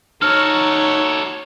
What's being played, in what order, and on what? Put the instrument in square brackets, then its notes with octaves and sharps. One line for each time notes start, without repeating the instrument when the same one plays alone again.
[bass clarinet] D#4 [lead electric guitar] F#4 A4 [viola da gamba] C#5 [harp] F6